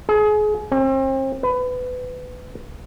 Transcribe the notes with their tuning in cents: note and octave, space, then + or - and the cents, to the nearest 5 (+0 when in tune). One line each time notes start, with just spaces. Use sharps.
G#4 +30
C4 +40
B4 +25